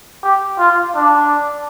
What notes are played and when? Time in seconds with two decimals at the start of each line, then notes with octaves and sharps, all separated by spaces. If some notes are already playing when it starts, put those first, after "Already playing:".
0.23 G4
0.59 F4
0.95 D4